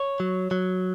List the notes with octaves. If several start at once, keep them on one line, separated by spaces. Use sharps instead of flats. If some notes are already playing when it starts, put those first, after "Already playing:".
Already playing: C#5
F#3
F#3